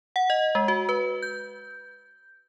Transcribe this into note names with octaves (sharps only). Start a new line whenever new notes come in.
F#5
D#5
G#3
F#4
B4
G6